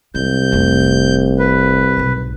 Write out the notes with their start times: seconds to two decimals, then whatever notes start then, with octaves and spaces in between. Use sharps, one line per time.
0.15 C2 G#3 G6
0.52 F1 A3
1.39 B4
1.97 B1 G#2